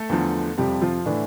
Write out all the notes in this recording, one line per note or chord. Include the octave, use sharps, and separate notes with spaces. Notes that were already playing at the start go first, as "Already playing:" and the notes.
Already playing: A3 A4
E2 D3 F3
F2 C3 F3 G3 G4
F3 F4
A2 D3 E3 D4